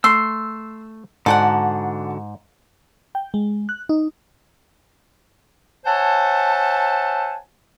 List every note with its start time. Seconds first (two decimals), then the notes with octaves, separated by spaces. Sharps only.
0.04 A3 C6 E6
1.26 G#2 D3 F#4 A4 D5 F#5
3.15 G5
3.34 G#3
3.69 F#6
3.89 D#4
5.85 C5 C#5 E5 F#5 G#5 A5